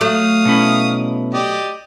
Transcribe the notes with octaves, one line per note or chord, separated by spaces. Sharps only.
F#3 A3 F5 D#6
B2 C#4 E4
G4 D5 D#5